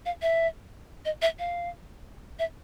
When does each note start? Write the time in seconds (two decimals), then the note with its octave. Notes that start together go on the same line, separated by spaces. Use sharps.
0.06 F5
0.22 E5
1.05 D#5
1.22 E5
1.39 F5
2.39 E5